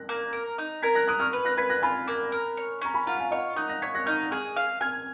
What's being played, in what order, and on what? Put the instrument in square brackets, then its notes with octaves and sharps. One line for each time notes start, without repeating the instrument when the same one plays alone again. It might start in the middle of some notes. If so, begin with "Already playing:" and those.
Already playing: [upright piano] F#6 A#6
[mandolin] A#3
A#4
D#4
[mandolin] A#4 [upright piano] G#6 B6
[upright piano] F#6 A#6
[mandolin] A#4 [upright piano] D#6 F#6
[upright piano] C#6 F6
[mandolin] B4
[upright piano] F#6 A#6
[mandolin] B4 [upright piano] G#6 B6
[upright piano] F#6 A#6
[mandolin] F4 [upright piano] G#5 B5
[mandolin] A#3
A#4
C#5
[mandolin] C#4 [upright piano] A#5
[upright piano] G#5 B5
[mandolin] F4 [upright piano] F#5 A#5
[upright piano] F5 G#5
[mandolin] C#5 [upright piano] D#5 F#5
[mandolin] D#4 [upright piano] D#6 F#6
[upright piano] F#6 A#6
[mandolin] C#5 [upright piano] G#6 B6
[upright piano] F#6 A#6
[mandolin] D#4 [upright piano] C#6 F6
[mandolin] G#4 [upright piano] C#6 F6
[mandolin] F5
[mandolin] G#5 [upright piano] F6 G#6